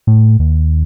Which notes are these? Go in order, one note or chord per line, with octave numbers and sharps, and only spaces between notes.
A2
D#2